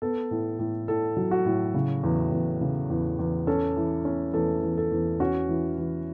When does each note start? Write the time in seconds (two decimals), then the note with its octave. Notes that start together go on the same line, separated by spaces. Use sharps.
0.02 B3 A4
0.31 A2
0.59 A2
0.88 A2 A4
1.17 F#3
1.31 F#4
1.46 A2
1.74 C#3
2.03 E2
2.32 E2
2.61 C#3
2.90 E2
3.19 E2
3.47 C#4 A4
3.76 E3
4.05 C#4
4.34 E2 A4
4.62 E2
4.77 A4
4.92 E2
5.20 C#4 F#4
5.49 E3
5.78 E3